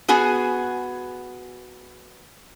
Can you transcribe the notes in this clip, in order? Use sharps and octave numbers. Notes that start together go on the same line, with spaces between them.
B3 F#4 G#4 G#5